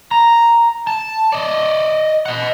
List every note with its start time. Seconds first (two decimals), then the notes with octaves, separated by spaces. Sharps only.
0.11 A#5
0.87 A5
1.32 D5 D#5
2.26 D#5 F#5